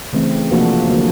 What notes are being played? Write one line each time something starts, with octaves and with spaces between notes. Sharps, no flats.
C#3 E3 A3 C4
C3 F3 A#3 D4 F#4
D3 F#3 A#3